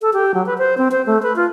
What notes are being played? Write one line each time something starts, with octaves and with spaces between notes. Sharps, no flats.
A4
G4
F#3
B4
C5
C4
C5
A3
B4
F4